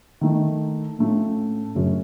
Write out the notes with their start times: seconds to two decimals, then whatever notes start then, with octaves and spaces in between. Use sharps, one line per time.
0.21 D#3 A3 D#4
0.99 A2 A3 C#4 F4
1.75 F#2 C#3 A3 C#4 F#4